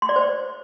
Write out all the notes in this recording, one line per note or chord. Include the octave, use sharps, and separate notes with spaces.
C6
D5
C5